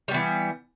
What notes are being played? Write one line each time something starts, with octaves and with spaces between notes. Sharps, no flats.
E3 G3 B3